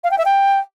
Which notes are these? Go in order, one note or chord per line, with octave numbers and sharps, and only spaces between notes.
F5
G5
E5
G5